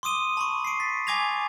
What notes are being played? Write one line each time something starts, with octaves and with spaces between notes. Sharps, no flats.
C6 D6 D#6 D#7 G7
A5 B5 C#6
C7 D7
A6 B6
G#5 C#6 D6 G#6 A#6 F7